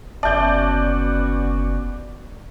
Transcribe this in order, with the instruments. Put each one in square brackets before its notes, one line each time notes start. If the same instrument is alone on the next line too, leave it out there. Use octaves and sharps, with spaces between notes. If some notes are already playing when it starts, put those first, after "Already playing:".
[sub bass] F#1 [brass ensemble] B3 C#4 F#4 [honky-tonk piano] D5 G6 [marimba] E5 A5